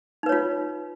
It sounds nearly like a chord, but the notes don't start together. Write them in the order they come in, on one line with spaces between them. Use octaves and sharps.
D#4 B4 C#5 F4